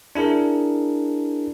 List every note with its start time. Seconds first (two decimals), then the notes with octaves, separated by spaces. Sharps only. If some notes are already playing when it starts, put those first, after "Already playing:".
0.15 D4 E4 G#4 A#4